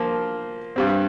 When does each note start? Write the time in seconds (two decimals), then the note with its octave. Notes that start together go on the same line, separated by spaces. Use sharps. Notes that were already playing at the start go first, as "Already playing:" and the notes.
Already playing: F3 A#3 F4
0.76 G2 G3 C4